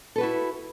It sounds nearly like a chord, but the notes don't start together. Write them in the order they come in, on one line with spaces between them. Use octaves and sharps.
A4 B4 F#4 E4